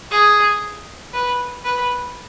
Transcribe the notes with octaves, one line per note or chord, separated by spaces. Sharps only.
G#4
B4
B4